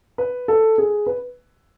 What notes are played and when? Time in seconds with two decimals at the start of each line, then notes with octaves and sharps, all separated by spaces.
0.18 B4
0.48 A4
0.78 G#4
1.06 B4